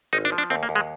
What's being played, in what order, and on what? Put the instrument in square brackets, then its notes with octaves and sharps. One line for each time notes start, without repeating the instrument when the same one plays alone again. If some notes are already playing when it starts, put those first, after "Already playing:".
[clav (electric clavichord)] G#1 D#4
D4
F3
D4
D#2 C4
A#3
D#2
G#3